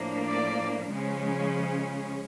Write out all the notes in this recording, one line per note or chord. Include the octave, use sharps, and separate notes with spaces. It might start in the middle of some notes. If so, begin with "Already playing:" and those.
Already playing: A2 F3 A#3 D4
D5
C#3 F3 G#3 C#4